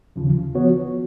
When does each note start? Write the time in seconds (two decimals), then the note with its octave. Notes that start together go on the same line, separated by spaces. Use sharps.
0.16 D#2 C#3 F3
0.55 F3 B3 F#4 C#5